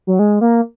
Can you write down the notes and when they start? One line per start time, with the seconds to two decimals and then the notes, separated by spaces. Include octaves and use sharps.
0.07 F#3
0.19 G#3
0.41 A#3